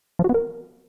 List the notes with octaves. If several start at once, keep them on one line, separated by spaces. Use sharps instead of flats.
F3
F#4
B3
A#4